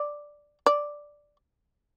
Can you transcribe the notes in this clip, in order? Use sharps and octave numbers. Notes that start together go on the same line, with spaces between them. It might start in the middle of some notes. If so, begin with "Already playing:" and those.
Already playing: D5
D5